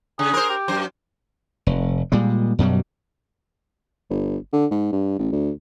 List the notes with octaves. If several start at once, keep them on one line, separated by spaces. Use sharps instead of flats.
C#3 G#4
A#4 C5
G4
F#2 C5
F1
A#2 G3 G#3
F#2 B2 F#3 G3
G1
D3
G#2
G2
A1
D2